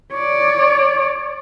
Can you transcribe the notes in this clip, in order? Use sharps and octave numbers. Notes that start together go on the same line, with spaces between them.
C#5 D5